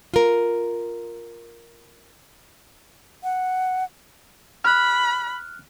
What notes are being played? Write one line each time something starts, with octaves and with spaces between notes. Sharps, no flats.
F4 A#4
F#5
B5 F6 F#6